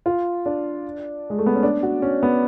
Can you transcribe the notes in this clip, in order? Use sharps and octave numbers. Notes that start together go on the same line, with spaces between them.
F4
D4
G#3
A3
B3
C#4
D4
F#4
C#4
B3